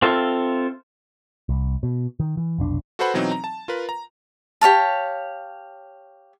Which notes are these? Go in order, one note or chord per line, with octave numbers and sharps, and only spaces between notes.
C4 F4 A4 E5 F5
C2
B2
D#3
E3
F1 B1 D4
F#4 A4 B4 C5 F#5 B5
B2 E3 F#3 C4 D#4
A#5
A5
F4 A#4 B4
A#5
G4 C#5 F5 A5